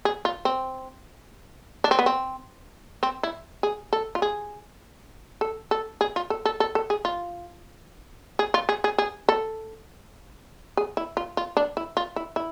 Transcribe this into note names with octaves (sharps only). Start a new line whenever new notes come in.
G#4
F4
C4
D4
C4
B3
C4
C4
E4
G#4
A4
F4
G#4
A4
A4
G#4
F4
A4
A4
A4
A4
G#4
F4
G#4
F4
G#4
G#4
G#4
A4
G#4
E4
F4
F4
D4
E4
F4
E4
E4